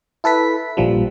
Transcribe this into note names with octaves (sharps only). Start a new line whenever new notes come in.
E4 A4 B4 B6
A#1 F3 G3